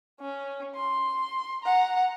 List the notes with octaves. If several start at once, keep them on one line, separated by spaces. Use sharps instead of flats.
C#4
C6
F#5 A#5